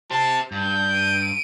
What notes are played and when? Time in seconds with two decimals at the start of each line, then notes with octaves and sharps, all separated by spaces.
0.11 G4 C5 A5
0.52 G2 G6
0.92 D7 D#7